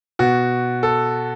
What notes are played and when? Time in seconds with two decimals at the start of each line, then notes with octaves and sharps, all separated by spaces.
0.19 B2 F#4
0.83 A4